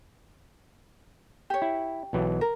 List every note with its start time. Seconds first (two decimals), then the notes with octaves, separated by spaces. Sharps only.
1.50 G4 C#5
1.62 E4
2.13 B1 E3 F#3
2.41 A#4